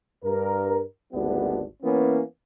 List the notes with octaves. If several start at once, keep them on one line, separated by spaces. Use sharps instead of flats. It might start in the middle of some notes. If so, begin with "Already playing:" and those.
G2 A#4
G#1 D2 G3 B3 D4 E4
E3 A#3 B3 C#4